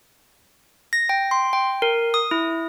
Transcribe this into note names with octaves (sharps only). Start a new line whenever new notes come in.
A#6
G5
C6
G5
A#4
D#6
E4